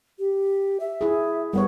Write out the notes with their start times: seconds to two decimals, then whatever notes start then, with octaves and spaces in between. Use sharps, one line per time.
0.19 G4
0.80 E5
1.01 E4 G#4
1.53 G3 B3 A#4 C#5